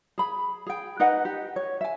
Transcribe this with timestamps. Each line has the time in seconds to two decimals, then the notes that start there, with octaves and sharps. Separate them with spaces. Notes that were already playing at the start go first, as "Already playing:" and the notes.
0.18 G#4 B5
0.67 G#4 G5
1.00 D#4 B4 D#5 F#5
1.25 G4
1.56 C#5
1.81 E5 G#5